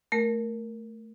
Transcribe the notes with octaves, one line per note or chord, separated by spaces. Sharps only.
A3 A#4